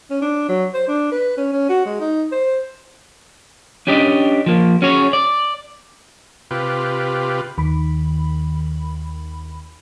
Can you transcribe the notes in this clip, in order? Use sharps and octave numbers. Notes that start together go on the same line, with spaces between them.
C#4
D4
F#3
C5
D4
B4
C#4
C#4
F#4
G#3
D#4
C5
C#4 D4 G4 D5 D#5
F3 A#3
C#4 F#4 G#4 C#5
D5
C3 F4 G4 B4
D#2 D#3 B5